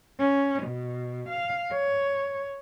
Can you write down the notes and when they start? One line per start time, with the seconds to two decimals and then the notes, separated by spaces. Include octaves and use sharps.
0.20 C#4
0.63 B2
1.29 F5
1.72 C#5